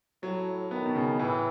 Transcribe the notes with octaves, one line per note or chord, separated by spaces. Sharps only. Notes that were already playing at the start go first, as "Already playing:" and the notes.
A2 F#3
D#3 B3
B2
C#3
A2 E3